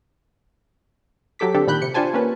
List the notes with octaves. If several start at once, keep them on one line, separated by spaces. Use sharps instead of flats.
F#3 G4 A4 D6 B6
D3 C4 D4 G4 A4
A#2 D#3 B5 F#6 G6
C3 C#7
D4 F4 G4 C5 G#5 A5
A#3 C#4 B4